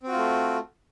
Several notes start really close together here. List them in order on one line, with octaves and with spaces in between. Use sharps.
C4 F#4 F4 A3